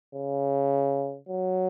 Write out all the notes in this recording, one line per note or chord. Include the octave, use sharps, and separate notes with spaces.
C#3
F#3